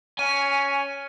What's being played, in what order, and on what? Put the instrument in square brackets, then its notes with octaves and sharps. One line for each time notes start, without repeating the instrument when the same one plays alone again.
[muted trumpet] C#4 [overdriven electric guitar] G#5